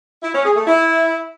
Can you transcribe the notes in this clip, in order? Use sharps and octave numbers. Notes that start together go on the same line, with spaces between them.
E4
C#4
G#4
A3
E4